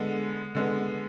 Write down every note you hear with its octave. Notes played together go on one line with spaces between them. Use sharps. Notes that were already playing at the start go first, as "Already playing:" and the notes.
Already playing: D3 G#3 B3
D3 G#3 B3